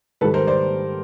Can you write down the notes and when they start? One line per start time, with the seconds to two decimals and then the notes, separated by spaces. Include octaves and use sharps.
0.21 G#2 D#3 G3 A4 B4
0.34 A#4 C5
0.47 C5 D5